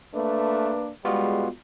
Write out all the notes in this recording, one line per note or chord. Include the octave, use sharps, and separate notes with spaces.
A3 A#3 D4 B4
G3 G#3 B3 F4 F#4